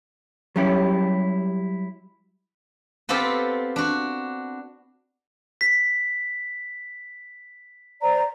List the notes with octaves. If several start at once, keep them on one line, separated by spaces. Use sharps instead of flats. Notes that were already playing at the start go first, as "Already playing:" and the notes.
F#3 G3 C#4 E4 G4
B3 C4 F4 G4 A4 C5
D4 F#4
B6
C5 D5 A#5